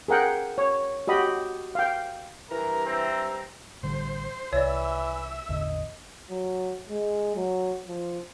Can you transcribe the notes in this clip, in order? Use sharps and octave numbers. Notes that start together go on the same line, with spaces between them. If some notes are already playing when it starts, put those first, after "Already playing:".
G#4 A#4 F#5 G5
C#5
F#4 G4 D#5 B5
F5 G5
G2 E3 A#4 A#5
C4 E5
A1 D3 G3 C5
C2 E3 C#5 D5 E5
A1 E2 D3 D#5
F#3
G#3
F#3
F3